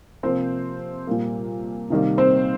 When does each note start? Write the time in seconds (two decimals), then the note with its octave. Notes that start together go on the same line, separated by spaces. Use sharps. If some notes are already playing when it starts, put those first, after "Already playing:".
0.23 C3 F3 A#3 C4 C5
1.07 A#2 G3 A#3
1.90 C3 D#3 G3 A#3
2.18 C4 C5